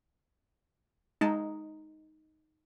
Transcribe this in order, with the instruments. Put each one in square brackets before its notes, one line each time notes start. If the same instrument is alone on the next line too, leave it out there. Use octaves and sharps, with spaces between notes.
[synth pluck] G#3 A5 [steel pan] D#4